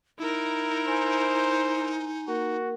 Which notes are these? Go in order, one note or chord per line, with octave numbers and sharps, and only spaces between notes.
D#4 E4 A#4
C5 G#5
A#3 F#4 A#4 F#5